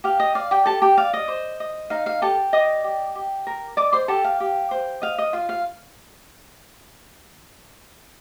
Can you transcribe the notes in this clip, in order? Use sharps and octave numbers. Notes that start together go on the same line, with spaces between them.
G4 F5
D#5
D5 F5
G4 G5
G4 A4 A5
G4 G5
D5 F5
D#5
C5
D#5
D#4 F5
F5
G4 A4 A5
D5 D#5 D#6
G4
G4
A#4
D5 D#5 D6
C5 C6
G4 A4 A5
F5
G4
C5
D#5 F5
D#5
F4 F5
F5